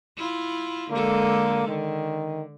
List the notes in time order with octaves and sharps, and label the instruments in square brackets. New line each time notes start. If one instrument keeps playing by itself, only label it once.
[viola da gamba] E4 F4
[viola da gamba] D3 G#3 A4 [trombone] A#3
[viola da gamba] D3 [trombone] D#3